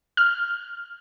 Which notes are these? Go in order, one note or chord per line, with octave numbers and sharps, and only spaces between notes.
F6